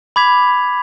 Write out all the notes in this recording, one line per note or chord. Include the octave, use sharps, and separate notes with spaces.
B5 D6 G#6 B6 F7